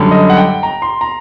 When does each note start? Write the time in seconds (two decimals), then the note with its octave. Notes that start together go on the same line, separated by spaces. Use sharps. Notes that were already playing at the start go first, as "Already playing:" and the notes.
Already playing: F#2 D3 G3
0.11 D#5
0.30 F#5
0.37 G5
0.63 A#5
0.82 C6
1.01 A#5